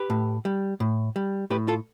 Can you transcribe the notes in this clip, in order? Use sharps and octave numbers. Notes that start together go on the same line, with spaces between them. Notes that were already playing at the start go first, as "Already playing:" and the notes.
Already playing: G4 B4
A2
G3
A2
G3
A2 G4 B4
F4 A4